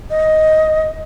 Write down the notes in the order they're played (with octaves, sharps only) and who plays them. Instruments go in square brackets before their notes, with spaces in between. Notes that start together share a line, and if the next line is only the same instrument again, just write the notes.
[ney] D#5